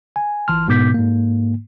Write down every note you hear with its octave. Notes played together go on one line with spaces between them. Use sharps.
G#5
G1 E3 A5 C6 F6
G#2 B2 B3 D6 G6 B6
G#2 A#3